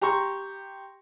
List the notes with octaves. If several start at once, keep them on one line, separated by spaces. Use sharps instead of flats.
G4 A#5 C6 C#6